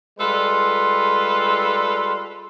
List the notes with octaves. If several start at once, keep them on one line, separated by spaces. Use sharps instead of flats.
G3 G#3 F4 A4 B4 C6